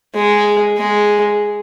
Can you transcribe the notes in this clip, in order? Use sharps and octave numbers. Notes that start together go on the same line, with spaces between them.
G#3
G#3